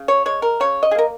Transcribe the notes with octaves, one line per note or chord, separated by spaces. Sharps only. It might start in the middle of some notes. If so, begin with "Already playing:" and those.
Already playing: C#3
C#5
G#3 C#5
A#4
C#3 C#5
D#5
G#4
A#3 A#4